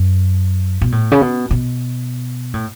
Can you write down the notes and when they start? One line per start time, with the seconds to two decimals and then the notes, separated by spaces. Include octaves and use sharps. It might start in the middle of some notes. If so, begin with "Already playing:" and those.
Already playing: F#2
0.81 B2
0.92 A2
1.11 C#3
1.21 B2
1.51 B2
2.54 A2